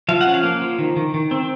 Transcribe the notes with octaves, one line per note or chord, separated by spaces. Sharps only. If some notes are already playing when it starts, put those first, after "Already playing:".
F3 F5
F#5
C#4
F5
A#3
F3
D#3
D#3
D#3
C4